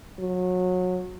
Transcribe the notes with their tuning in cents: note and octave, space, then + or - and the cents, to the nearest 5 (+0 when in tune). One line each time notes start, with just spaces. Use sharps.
F#3 -25